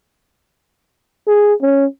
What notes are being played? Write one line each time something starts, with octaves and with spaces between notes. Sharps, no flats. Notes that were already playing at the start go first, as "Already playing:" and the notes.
G#4
C#4